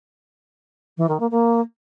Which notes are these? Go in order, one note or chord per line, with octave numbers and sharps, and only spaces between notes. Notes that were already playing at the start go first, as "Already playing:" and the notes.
E3
D#3
A#3
A#3